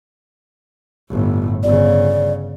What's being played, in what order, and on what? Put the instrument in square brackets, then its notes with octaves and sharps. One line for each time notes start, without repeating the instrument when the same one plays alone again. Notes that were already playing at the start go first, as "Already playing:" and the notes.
[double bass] G1 A2
[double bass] G1 C#3 [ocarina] D5